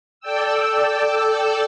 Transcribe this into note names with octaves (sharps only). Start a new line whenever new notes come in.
A4 D5 G5 E6